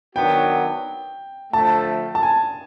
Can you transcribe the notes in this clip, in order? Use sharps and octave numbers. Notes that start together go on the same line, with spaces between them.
D#3 F#3 B3 D4 F#4 G5
D3 F3 A3 A5
A5
G#5